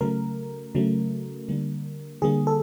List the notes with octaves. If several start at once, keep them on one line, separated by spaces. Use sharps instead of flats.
C#3 F#3 A3 A#4
C#3 F#3 A3
D3 G3 A#3
D3 G3 A#3 G#4
A4